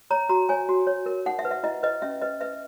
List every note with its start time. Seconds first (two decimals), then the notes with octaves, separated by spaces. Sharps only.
0.11 C#5 A#5
0.29 F#4 A#5
0.49 C#5 G#5
0.69 F#4
0.87 C#5
1.06 A#4
1.26 D#4 F#5
1.39 E5
1.45 B4
1.51 E5
1.64 E4 D#5
1.83 B4 D#5
2.02 C#4 E5
2.22 B4 D#5
2.41 B4 E5